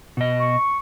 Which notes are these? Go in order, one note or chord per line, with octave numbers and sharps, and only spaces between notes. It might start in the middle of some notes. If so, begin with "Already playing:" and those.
B2 D#5
C#6